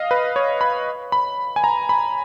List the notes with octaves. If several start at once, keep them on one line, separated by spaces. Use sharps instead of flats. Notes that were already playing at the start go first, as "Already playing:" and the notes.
Already playing: D#5 F5
B4
C#5
B5
B5
G#5
A#5
B5